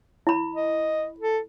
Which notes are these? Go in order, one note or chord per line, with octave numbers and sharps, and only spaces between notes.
E4 B5
D#5
A4